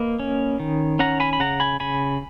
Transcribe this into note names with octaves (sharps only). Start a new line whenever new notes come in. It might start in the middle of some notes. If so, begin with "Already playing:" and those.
Already playing: A#3 B4 D#5
C#4
D#3
C#4 F#5 A#5
G#5 B5
B5
C#3 F#5 A#5
G#5 B5
C#3 G#5 B5